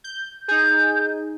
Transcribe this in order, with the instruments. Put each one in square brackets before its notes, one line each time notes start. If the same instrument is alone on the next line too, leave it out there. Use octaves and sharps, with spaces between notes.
[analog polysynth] G6
[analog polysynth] D#4 G#4 [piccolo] G6